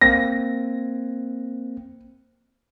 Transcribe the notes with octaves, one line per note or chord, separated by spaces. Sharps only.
A#3 C4 A#6